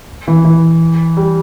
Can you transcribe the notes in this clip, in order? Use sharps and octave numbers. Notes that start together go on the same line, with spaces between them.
E3
E3
G3